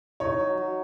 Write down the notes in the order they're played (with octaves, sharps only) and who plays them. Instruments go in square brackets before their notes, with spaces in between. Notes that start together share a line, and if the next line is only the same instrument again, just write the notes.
[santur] D#4 [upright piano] C#5
[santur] F#3
F#3